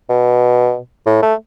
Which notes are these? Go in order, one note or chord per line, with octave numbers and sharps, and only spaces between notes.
B2
A2
A3